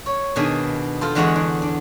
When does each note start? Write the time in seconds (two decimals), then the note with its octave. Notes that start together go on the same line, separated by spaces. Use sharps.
0.06 C#5
0.36 B2 D#3 B3 D4 G#4 G#5
1.01 F4 A4 C5
1.15 E2 D3 G#3 F#4 G#4 F#5
1.36 D4
1.62 D4